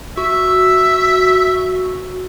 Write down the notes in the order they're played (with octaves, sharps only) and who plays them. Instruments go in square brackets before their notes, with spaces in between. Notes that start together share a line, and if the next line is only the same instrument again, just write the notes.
[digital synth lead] F#4 [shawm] E5